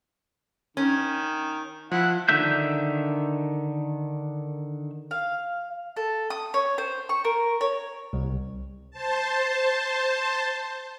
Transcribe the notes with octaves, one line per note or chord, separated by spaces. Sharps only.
D#3 C#4
F3 E4 F#5
D3 D#3 D4 E5 G6
F5
A4
D#6
C#5
C5
C#6
A#4
C#5
C2
C5 A5